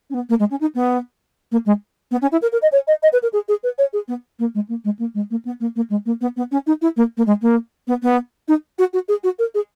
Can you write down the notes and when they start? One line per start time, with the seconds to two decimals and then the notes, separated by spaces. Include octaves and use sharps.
0.10 C#4
0.14 B3
0.29 A#3
0.39 G#3
0.50 C#4
0.61 D#4
0.75 B3
1.51 A#3
1.66 G#3
2.11 B3
2.22 C#4
2.32 E4
2.42 A#4
2.52 A#4
2.62 D#5
2.72 C#5
2.87 D#5
3.03 D#5
3.13 B4
3.22 A#4
3.33 G#4
3.48 G#4
3.63 B4
3.78 C#5
3.93 G#4
4.08 B3
4.39 A#3
4.55 G#3
4.69 A#3
4.84 G#3
4.99 A#3
5.14 G#3
5.30 A#3
5.45 B3
5.60 A#3
5.76 A#3
5.90 G#3
6.06 A#3
6.21 B3
6.36 B3
6.51 C#4
6.67 D#4
6.82 E4
6.97 A#3
7.17 A#3
7.26 G#3
7.42 A#3
7.87 B3
8.02 B3
8.48 D#4
8.78 F#4
8.93 F#4
9.08 G#4
9.23 F#4
9.39 A#4
9.54 G#4